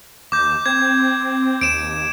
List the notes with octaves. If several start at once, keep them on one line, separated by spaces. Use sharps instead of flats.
D#2 D6 G6
C4 G#6
D#2 D7 E7